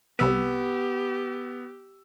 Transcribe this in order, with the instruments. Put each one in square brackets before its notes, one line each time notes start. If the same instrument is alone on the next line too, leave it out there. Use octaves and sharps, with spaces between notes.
[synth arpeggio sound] C2 C3 B4 [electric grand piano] B3 E6 [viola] G4